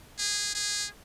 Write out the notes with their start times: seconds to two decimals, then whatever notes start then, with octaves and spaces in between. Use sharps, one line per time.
0.19 G#4
0.55 G#4